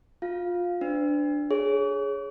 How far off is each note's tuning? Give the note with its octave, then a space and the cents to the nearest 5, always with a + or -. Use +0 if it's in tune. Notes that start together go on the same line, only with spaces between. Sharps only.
F4 +20 F5 +0
D4 +0 C5 -45
G#4 +0 C#5 +0